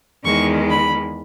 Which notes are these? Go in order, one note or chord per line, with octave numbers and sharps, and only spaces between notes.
E2 D#3 G#3 C#6
B5